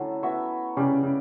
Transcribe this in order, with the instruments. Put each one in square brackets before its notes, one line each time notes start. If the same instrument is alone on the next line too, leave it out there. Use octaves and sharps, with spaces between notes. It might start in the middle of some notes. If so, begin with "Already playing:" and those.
Already playing: [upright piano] D3 [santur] F#3 A3 C#4 E4 A4
[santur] B3 F#4 C#5 E5
[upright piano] C#3 [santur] C#4 G4 D5
[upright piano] C#3